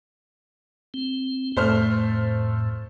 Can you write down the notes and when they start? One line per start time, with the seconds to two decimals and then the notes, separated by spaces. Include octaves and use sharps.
0.94 C4
1.57 F2 A2 A3 C5 F6